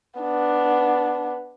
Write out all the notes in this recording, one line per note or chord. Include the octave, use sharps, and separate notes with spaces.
B3 D4